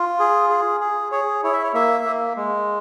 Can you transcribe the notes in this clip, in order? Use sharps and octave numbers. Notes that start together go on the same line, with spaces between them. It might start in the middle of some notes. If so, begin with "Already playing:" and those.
Already playing: F4
G#4
G#4
G#4
G#4 C#5
E4 C#5
E5
C#5
A#3 E5
A#3
G#3